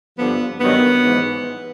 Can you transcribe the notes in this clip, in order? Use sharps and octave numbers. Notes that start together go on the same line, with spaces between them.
G2 D3 F3 B3
G2 D#3 F#3 B3
G#2 E3